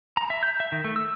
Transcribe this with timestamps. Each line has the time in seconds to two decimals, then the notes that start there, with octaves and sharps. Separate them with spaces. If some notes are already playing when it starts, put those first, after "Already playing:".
0.17 A#5
0.30 E5
0.43 G6
0.60 E5
0.72 D#3
0.84 A3
0.96 E6